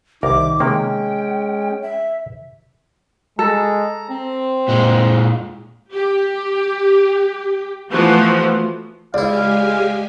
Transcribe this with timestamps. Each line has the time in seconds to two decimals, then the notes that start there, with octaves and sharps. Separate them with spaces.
0.23 C2 D#3 A#4 D6
0.60 C3 D#3 G#3 A#3 C#4 G5
1.82 E5
3.39 G#3 A4 A#5
4.09 C4 C5
4.68 A#2 G#3
5.94 G4
7.92 E3 F3 A3 B3 F#4 C5
9.14 C#2 G#3 E4 G4 D5 F5 G#5